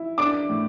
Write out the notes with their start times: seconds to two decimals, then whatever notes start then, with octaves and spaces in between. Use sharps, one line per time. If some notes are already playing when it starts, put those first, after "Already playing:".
Already playing: E4
0.18 D4 D6
0.49 A2